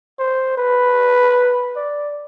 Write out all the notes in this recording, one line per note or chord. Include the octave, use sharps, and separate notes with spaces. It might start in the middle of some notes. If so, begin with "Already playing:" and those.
C5
B4
D5